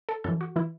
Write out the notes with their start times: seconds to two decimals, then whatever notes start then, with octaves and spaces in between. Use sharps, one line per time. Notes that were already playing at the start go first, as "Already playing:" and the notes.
0.09 A4
0.24 F#2 E3 A4
0.41 F#4
0.56 E3 E4